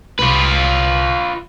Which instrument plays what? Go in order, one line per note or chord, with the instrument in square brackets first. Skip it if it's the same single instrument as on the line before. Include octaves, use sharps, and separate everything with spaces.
[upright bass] C2 [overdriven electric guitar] F4 B4